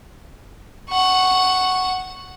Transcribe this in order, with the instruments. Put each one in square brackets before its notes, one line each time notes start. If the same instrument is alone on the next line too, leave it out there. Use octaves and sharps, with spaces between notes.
[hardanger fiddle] F#5 C#6